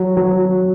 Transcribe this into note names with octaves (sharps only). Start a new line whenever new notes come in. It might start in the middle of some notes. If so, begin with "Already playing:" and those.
Already playing: F#3
F#3